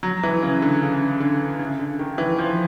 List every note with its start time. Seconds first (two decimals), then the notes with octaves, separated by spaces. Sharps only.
0.03 F#3
0.23 E3
0.42 C#3
0.62 D3
0.82 C#3
1.20 D3
1.59 C#3
1.79 D3
1.99 D#3
2.18 E3
2.38 F3